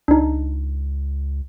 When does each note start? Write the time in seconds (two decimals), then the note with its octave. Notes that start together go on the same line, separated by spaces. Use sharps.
0.08 C#2 D4 D#4